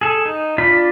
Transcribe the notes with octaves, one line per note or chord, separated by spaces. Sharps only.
G#4 A4
D#4
D4 F4 D5 B5